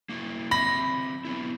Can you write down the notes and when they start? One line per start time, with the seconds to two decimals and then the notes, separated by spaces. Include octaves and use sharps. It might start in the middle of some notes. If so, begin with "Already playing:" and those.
0.09 A#3 E4 F#4
0.51 F#3 C4 E5 B5 A#6
1.25 F#3 B3 E4